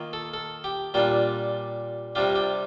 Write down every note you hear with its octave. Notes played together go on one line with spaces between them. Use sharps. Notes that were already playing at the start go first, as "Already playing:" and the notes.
Already playing: D#3 A#3 F4
A4
A4
G4
A#2 G3 D4 F4 G4
C3 G3 D4 F4 G4
G4